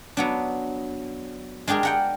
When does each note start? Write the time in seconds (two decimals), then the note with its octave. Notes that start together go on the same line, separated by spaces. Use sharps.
0.17 F#3 B3 D4
1.68 G#3 D4 G4 G#4 A#4
1.83 A#4 F#5 G5